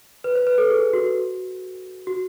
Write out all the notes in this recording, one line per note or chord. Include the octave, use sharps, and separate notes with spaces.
B4
C5
B4
A4
G#4
F#4
F#4